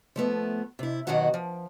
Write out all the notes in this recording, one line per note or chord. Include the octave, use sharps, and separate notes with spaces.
F3 A3 B3
C3 E4
D#2 B2 D#3 F#3 F#4 F#5
F3